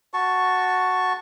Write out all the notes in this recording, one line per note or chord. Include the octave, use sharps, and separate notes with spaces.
F#4 A5 C#6